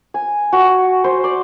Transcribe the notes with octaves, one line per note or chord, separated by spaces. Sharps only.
G#5
F#4
C5
D5